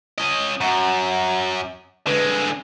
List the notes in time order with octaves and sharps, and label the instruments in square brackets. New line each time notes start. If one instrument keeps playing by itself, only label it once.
[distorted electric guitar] C#4 D#5
[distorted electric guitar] F#2 [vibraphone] F#5 A#5
[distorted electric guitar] D3 G#3 [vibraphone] B4